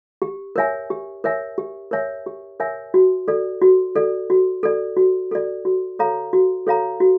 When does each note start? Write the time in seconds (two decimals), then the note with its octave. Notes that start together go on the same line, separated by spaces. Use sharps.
0.22 G4
0.56 A#4 C#5 E5 G#5
0.90 G4
1.24 A#4 C#5 E5 G#5
1.58 G4
1.91 A#4 C#5 E5 G#5
2.26 G4
2.60 A#4 C#5 E5 G#5
2.94 F#4
3.28 A4 D5
3.62 F#4
3.96 A4 D5
4.30 F#4
4.63 A4 D5
4.97 F#4
5.31 A4 D5
5.65 F#4
5.99 A4 C#5 F5 A#5
6.33 F#4
6.67 A4 C#5 F5 A#5
7.00 F#4